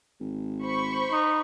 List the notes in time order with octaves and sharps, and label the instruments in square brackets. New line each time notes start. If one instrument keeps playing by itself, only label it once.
[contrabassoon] G#1
[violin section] C5 B5 C#6
[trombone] D#4